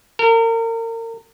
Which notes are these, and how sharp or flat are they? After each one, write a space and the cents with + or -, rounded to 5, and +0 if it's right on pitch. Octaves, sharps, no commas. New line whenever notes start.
A#4 -35